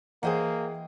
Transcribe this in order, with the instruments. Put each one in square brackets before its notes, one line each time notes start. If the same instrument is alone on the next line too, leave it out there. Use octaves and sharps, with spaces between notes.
[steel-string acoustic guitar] E3 D#5 G5 [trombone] A#3 [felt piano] G#4 C5 F#5